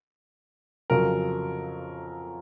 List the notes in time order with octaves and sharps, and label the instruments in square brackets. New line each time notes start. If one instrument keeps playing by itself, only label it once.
[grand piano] F2 C#3 F#3 A#4